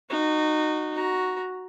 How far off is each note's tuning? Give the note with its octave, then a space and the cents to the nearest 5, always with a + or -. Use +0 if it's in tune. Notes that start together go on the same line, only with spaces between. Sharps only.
D#4 -20 F#4 +0
F#4 +0 A#5 +5